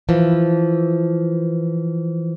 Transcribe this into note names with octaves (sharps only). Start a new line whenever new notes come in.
E3 F3